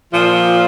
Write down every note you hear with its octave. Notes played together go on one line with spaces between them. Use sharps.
A#2 F3